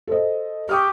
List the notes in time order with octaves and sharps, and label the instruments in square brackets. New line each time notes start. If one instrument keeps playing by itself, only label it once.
[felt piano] A4 C5 D#5
[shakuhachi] G4 [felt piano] C#6 D#6 F6